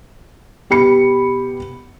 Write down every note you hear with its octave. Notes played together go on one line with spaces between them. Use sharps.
B2 G4 B5 C#7